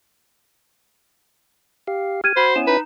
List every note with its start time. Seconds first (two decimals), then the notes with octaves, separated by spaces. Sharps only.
1.87 G4 F5
2.24 G4 F6 G#6 D#7
2.37 F#4 C5 B5
2.56 B3 C#4 E4 G#5 E7
2.67 D#4 B4